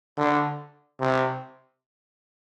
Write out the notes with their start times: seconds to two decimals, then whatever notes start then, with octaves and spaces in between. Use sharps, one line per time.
0.17 D3
1.00 C3